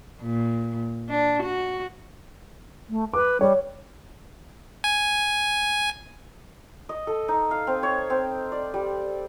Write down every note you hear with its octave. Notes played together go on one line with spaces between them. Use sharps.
A#2
D4
F#4
A3
B4 D6
G3 C#5
G#5
D#5
A4
D#4
F5
C4
C#5
C4
D5
G3